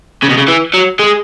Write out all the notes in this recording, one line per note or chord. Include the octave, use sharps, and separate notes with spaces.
C#3
B2
C#3
E3
F#3
G#3